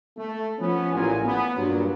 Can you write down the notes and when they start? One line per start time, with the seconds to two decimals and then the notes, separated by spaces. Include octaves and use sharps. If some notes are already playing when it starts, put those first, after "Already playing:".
0.17 A3
0.59 F3 B3 C#4
0.93 A1 A#2 G#5
1.26 B3
1.56 G2 A#2 F#3